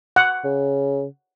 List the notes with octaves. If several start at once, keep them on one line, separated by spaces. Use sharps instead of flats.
F#5
C#3